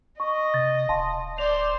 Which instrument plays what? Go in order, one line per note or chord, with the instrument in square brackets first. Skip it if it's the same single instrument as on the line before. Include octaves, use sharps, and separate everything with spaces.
[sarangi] D#5 [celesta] C#6
[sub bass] C3 [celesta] A6
[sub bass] D1 [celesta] F5 A5 C6
[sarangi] C5 [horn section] D5 [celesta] F7